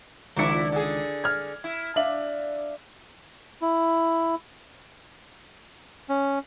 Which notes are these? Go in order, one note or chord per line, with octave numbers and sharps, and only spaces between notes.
C#2 D#3 F3 D4 E4 C#7
D3 G#4
F6 G#6
E4
D4 E5 F5 F#7
E4
C#4